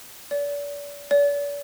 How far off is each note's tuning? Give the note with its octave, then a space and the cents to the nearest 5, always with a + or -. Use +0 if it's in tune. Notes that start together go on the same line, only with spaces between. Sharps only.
D5 -40
D5 -45